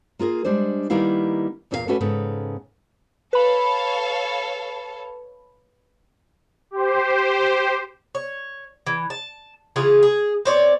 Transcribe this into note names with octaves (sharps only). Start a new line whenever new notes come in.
A#3 F4 G#4 A#4
G3 G#3 D4 C5
D#3 G3 A#3 B3 E4 F5
E2 A#2 C#4 F4 A#4 F5
A3 C#4 D4 F#4 A4 B4
G#2 C#3 B3 A4
A4 B4 C#5 F5 B5
G4 C5
C#5
E3
A5
C#3 E3 F4 G#4
G#4
C4 C#5 D5